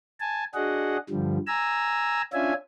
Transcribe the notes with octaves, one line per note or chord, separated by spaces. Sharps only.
G#5 A5
D4 F#4 G#4 D#5 F#5
G2 D3 F3 G3
G#5 A#5 E6
C#4 D4 F4 E5 G#5